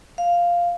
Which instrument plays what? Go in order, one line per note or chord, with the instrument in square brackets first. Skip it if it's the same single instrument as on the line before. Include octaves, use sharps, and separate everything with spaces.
[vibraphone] F5